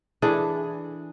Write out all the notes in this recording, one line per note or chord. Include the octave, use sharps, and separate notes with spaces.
E3 D4 G#4 A4